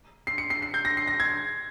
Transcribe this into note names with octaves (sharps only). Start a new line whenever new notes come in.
C7
C#7
C7
C7
G6
A#6
C7
A#6
G#6